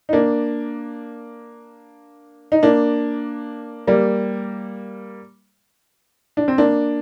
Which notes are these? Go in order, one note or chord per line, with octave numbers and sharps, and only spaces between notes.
D#4
A#3 D4
D#4
A#3 D4
G3 A#3
D4
C4
A#3 D4